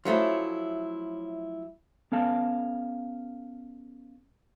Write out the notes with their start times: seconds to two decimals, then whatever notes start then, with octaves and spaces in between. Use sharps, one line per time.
0.05 F3 F#3 A3 C#4 E4
2.12 B3 C#4 A4 F5 A5